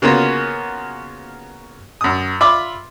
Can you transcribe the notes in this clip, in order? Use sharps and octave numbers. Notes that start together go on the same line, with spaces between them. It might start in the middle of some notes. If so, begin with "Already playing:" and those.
C#3 A#3 B3 C#4 F4 F#4
F#2 D#6
F4 E5 B5 C6 D6